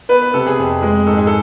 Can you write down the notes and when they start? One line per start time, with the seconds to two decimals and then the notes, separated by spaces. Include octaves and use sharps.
0.09 B3 B4
0.22 B4
0.34 C3 A4
0.47 G#4
0.58 F2 G#4
0.82 G#3
1.07 G#2 A4
1.17 G#4
1.27 A4